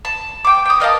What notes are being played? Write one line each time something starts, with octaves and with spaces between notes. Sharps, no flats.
A5
G5 D6
G5 D#6
A#4 D#5 F5 A5